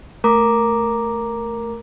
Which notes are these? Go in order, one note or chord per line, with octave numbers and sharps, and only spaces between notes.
A3 A#4 A#5 D6